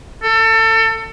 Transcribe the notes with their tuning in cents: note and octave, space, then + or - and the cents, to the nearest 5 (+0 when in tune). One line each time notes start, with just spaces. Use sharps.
A4 +30